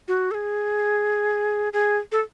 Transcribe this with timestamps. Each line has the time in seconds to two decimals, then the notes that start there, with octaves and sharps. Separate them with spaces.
0.08 F#4
0.31 A4
0.34 G#4
1.73 G#4
2.12 A4